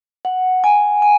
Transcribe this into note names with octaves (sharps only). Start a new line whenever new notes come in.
F#5
G#5
G#5